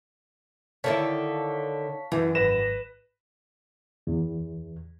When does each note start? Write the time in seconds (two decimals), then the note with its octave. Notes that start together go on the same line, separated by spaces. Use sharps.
0.84 D3 D#3 E4 C#5 F5 A5 B6
2.12 F#2 E3
2.35 G#1 B4 A#6 E7
4.07 E2